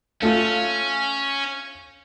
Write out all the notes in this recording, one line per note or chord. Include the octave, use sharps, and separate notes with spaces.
A3 C#4 F4